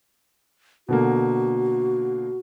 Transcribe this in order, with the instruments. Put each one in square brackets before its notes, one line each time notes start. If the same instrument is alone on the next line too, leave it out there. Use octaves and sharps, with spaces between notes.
[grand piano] B2 D3 A#3 [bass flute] F#4